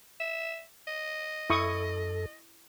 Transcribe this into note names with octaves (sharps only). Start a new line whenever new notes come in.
E5
D#5
F#2 E4 A4 C#6 D#6